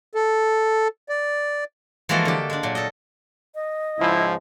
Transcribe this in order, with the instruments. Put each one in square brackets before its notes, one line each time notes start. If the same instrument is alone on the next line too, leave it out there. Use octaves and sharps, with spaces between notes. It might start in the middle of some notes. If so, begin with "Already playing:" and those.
[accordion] A4
D5
[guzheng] E3 F3 G#3 A#3 F#4 A4
D3 G4
G#3 D4
A#2 F#3
A4 D#5
[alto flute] D#5
[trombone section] C#2 G#2 F3 [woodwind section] E4